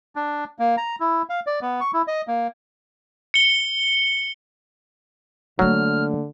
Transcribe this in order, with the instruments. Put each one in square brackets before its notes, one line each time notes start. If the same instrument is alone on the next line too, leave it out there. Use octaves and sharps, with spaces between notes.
[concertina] D4
A#3
A#5
E4
F5
D5
B3
C#6
E4
D#5
A#3
[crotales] C#7 G7
[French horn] D3 [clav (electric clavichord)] F#3 [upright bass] A3 A#3 [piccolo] F6